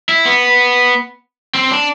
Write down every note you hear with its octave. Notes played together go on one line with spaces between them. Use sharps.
E4
B3
C4
D4